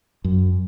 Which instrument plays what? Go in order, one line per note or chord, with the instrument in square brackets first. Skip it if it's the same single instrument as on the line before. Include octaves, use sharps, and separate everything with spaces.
[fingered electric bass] F#2